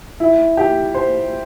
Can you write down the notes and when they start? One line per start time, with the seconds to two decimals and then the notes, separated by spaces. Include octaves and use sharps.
0.20 E4
0.57 G4
0.94 C5